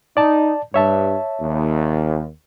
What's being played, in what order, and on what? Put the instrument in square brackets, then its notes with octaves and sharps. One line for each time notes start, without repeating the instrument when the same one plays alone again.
[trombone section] D#4 [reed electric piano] D5 A5
[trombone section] G2 [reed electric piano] C#5 E5 A5
[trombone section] D#2